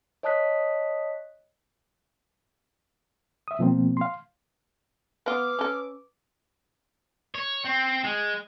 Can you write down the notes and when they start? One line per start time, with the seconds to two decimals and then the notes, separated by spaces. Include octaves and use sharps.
0.23 C#5 D#5 A5 D#6 F#6 B6
3.48 E5 D#6
3.59 B2 F3 A#3 C4
3.97 F5 C6
5.26 B3 F4 B4 D6 D#6 F6
5.59 C#4 A4
7.35 C#5
7.65 C4
8.04 G#3